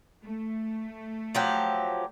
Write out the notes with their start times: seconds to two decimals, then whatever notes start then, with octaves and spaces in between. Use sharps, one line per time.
0.25 A3
1.35 F3 F#3 G4